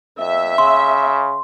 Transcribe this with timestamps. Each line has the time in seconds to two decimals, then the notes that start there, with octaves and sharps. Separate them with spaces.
0.20 F2 E5
0.58 C#3 C6